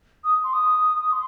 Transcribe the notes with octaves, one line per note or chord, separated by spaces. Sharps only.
D#6
C6
D#6
C6